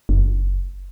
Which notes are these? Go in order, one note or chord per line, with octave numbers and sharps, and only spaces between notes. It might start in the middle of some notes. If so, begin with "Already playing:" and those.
F#1